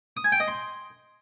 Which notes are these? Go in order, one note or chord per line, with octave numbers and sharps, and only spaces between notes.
D#6
G#5
G5
D#5
C6